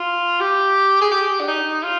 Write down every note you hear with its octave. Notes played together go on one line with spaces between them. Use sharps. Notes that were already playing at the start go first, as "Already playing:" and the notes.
Already playing: F4
G4
G#4
G4
D4
D#4
F4